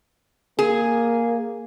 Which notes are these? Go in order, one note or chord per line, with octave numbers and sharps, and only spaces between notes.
A#3 G#4